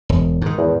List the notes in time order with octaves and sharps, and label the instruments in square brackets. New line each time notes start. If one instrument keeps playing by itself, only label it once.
[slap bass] E1
G#2 D#3
[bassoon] E2